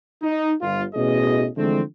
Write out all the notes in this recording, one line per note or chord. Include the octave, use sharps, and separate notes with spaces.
D#4
G1 F4
A1 B2 G#4 D#5
D3 E3 F3 G#3 A3 C4